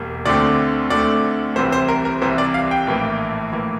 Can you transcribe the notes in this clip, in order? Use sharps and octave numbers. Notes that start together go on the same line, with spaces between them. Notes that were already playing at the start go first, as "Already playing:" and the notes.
Already playing: E1 G3 A#3
D2 D3 A3 C4 D5
D2 D3 A3 C4 D5
C2 C3 E3 G3 C5
C5
A#4
A#4
C2 C3 E3 G3 C5
D5
F5
G5
A#1 A2 E3 A#3
A#1 A2 E3 A#3